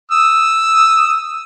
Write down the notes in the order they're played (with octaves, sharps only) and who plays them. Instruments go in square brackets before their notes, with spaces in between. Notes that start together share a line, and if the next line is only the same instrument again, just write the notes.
[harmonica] D#6 E6